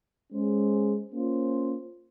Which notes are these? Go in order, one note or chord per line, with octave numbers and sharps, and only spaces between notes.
G#3 C#4 G#4 C5
A#3 C#4 F4 C5